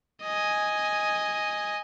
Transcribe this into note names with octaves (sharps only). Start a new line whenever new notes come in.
D#5 G#5